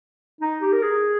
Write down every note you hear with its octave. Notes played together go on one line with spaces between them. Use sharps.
D#4
G4
A#4
G#4